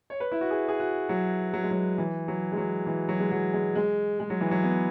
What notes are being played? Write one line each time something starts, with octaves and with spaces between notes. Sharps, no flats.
C#5
B4
E4
F#4
G#4
G#4
F#4
F#3
F#3
G#3
F#3
E3
F#3
G#3
F#3
E3
F#3
G#3
F#3
G#3
G#3
G#3
F#3
E3
F#3
B3